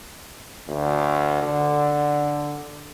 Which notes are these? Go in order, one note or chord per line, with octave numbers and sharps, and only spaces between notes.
D2
D3